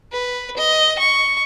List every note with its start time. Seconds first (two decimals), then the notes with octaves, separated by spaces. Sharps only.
0.12 B4
0.57 D#5
0.99 C#6